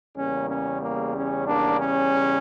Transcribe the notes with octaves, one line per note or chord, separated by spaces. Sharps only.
E2 C#3 G3 A#3 C#4
C#4
A#3
C#4
A#3 D4
C#4